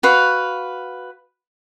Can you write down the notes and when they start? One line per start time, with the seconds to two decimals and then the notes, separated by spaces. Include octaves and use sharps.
0.03 F#4 B4 F5